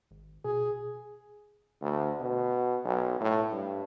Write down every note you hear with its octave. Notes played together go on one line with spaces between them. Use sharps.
G#1
B2 G#4
D2
B2
B1
A2
G2